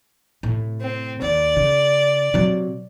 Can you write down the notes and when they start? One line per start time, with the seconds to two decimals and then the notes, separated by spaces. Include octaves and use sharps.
0.43 A2 C3
0.81 C4
1.22 D#2 D5
1.56 C#3
2.34 C3 F#3